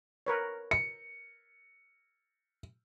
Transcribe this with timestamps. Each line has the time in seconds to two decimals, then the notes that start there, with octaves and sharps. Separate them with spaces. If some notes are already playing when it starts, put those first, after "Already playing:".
0.27 A#4 B4 C#5
0.71 C#7